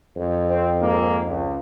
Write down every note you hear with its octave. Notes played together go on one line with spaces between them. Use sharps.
F2
C4
G#2 A#3
C#2